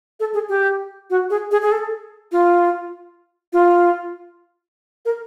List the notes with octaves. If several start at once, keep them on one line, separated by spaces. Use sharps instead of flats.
A4
G#4
G4
F#4
G#4
G#4
G#4
A4
F4
F4
A#4